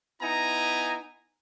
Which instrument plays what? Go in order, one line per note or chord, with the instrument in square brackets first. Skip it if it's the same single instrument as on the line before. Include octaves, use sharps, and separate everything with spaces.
[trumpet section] B3 D#4 E4 G#5 A#5